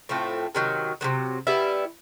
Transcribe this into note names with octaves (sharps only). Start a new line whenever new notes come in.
A2 F3 A3 C4
C3 D#3 F#3
C3 D#3 F#3
G3 B3 E4